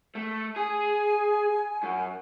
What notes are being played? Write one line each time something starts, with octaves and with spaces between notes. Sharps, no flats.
A3
G#4 G#5
F#2